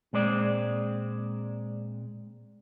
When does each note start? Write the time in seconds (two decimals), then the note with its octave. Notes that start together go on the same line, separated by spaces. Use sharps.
0.13 A#2 G#3 C4 D5